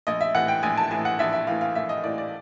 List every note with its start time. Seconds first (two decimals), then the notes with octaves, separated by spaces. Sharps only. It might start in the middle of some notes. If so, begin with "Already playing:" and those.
0.07 A#1 D#5
0.21 E5
0.35 A2 E3 F#5
0.48 G5
0.63 A#1 G#5
0.77 A5
0.91 A2 E3 G#5
1.05 F#5
1.19 A#1 E5
1.33 E5
1.47 A2 E3 F5
1.61 F5
1.75 A#1 E5
1.89 D#5
2.04 A2 E3 D5
2.18 D5